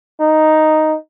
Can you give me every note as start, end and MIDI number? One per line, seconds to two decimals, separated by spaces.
0.20 0.95 63